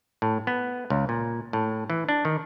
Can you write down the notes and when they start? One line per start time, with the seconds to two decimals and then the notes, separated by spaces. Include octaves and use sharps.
0.22 A2
0.47 B3
0.90 C#2
1.09 A#2
1.53 A2
1.90 E3
2.09 D4
2.25 D#3